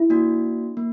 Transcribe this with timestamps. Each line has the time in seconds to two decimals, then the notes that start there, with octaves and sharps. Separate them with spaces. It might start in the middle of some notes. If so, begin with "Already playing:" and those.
Already playing: E4
0.10 A#3 D4 F#4
0.77 A#3